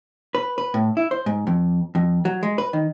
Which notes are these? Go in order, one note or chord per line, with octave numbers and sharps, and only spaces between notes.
B4
B4
A2
E4
C5
G#2
F2
F2
F#3
G#3
B4
D#3